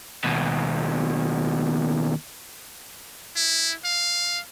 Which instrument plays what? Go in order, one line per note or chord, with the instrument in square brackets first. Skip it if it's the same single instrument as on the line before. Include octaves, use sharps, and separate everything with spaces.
[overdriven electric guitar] D#2 B2
[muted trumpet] E4
F5